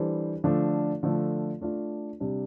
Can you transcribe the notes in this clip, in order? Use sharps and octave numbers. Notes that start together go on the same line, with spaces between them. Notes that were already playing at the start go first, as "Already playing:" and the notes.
Already playing: E3 G3 D4 A4 C5
D3 F3 A3 D4
D3 F3 A3
A3 D4 F4
C3 G3 D4